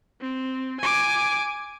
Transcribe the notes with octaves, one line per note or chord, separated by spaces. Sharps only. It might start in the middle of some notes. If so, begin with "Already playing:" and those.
C4
G#5 D6